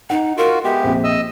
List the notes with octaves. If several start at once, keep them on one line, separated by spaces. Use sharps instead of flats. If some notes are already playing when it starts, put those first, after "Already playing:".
D#4 D#5 F#5
F4 F#4 A#4
G#3 B3 G4 E5
A#1 F2 C5
D#5 E6